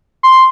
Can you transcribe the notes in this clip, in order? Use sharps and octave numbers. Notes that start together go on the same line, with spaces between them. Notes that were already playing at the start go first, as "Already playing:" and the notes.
C6